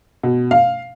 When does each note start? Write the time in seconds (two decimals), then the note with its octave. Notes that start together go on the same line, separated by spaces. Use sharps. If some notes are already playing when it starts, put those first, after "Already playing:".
0.23 B2
0.51 F5